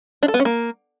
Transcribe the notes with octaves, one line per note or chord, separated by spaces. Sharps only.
D4
A4
B3
C#4
A#3